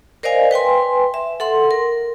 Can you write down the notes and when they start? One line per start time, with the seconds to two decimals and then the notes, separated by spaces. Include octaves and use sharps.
0.23 A#4 C5 D5 D#5 F5 G#5
0.51 B4 G5 G#5 C6
1.14 E5
1.40 A4 F#5 C6
1.71 A#4